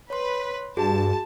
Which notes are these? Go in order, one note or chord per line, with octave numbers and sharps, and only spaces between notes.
B4 C#5 C6
G2 F#4 G#4 A5